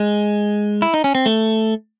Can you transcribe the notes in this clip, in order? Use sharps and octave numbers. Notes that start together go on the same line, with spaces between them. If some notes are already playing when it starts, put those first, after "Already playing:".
Already playing: G#3
E4
D#4
C#4
C4
A3